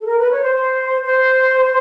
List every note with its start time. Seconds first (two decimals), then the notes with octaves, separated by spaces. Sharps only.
0.01 A4
0.06 A#4
0.19 B4
0.31 C#5
0.43 C5
1.05 C5